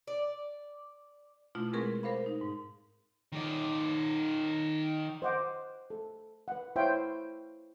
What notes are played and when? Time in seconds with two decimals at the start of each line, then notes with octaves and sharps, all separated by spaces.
0.07 D5
1.55 B2 A3 D4 E4 F4
1.73 G#3 C4 G#4 A#4 B4 C#6
2.03 A#4 C5 F5 B5
2.26 D#4
2.41 G#2
3.32 D#3 D5
5.22 C5 D#5 F#5 D6
5.90 A4
6.48 B4 F#5
6.76 E4 C5 C#5 E5 F5 G5